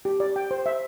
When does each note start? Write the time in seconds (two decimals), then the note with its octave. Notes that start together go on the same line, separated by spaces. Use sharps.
0.05 G4
0.20 D5
0.36 G5
0.51 C5
0.66 E5